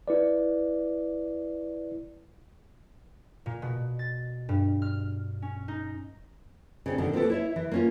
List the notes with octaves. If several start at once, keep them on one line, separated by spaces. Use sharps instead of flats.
E4 B4 D5
A#2
B2
A6
G2
F6
C#4
D#4
C#3 C4 D4
B2 D3 D#3
A#3 C4 F4 G4 A4 B4
E4 C#5 E5
E3
A#3 C#4 F4